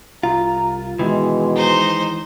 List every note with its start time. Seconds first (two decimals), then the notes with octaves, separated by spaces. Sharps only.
0.23 C2 F4 A#5
0.99 B2 D#3 E3 G#3
1.55 D#4 C5